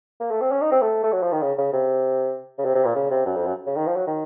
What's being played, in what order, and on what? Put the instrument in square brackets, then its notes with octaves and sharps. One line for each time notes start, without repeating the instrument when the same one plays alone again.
[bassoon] A#3
A3
C4
C#4
D#4
C4
A3
A3
F#3
F3
D#3
C#3
C#3
C3
C#3
C3
C3
A#2
C#3
C3
F#2
F2
F#2
C#3
D#3
F3
F#3
D#3